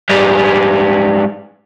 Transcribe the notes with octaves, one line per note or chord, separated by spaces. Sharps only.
G#2 G3